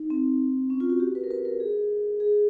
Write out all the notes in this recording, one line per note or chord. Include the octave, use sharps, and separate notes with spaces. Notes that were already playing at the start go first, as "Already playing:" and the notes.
Already playing: D#4
C4
C#4
F4
F#4
G4
B4
A#4
B4
A#4
G#4
G#4